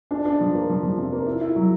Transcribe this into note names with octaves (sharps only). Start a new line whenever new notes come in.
D4
D4
F3
A#3
F3
F3
C3
A#3
E4
E4
F#3